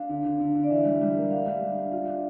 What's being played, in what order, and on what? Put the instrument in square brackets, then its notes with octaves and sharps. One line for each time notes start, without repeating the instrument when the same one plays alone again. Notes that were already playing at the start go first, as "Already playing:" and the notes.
Already playing: [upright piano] D4 [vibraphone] F5
[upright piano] D3
D3
D3
D3
[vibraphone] D5
[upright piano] E3 [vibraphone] E5
[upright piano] G3
G3
A#3
[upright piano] D4 [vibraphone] F5
[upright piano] G3
D4
D4
F4
D4